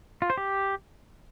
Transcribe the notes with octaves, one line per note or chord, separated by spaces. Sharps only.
F4
C5
G4